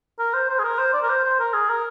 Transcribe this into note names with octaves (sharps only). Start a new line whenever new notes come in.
A#4
C5
C5
G#4
A#4
C5
D5
A#4
C5
C5
A#4
G#4
A#4